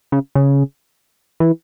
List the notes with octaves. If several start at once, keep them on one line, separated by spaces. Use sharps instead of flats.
C#3
C#3
E3